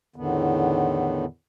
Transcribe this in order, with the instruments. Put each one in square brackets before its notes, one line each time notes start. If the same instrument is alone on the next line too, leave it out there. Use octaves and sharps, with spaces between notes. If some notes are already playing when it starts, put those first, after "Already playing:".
[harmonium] E2 A2 D3 D#3 B3